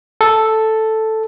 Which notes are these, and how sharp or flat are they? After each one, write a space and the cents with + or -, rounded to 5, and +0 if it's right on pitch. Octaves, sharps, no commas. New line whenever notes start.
A4 +0